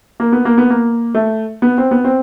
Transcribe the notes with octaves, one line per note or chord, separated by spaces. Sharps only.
A#3
B3
A#3
B3
A#3
A3
B3
C4
B3
C4